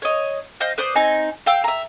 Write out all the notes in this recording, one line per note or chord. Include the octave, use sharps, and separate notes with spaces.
C#5 D#5
C5 D#5 F5 G5
B4 C5 D5 D#6
C4 D#4 G#5
F5 G5 E6
E5 A#5